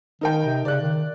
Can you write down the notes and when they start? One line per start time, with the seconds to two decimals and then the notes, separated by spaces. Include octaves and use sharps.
0.21 D#3 D#4 A#4 G5
0.45 C3
0.65 C#3 D5 F#6
0.82 D#3